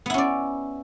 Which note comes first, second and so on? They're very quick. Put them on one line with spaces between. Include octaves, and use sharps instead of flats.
B3 E4 C#4 D5